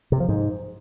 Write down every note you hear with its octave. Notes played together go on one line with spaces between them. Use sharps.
C3
F3
G#2